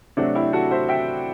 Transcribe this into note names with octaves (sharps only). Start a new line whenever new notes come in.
C3 F#3 A3 C4 D4 F#4
E4 G4
F#4 A4
C5 E5
E5 G5